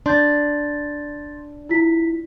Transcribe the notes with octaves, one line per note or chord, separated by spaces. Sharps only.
D4 C6 G6 A6
E4 F4 B6